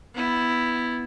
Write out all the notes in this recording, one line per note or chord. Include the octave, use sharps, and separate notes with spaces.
B3 E4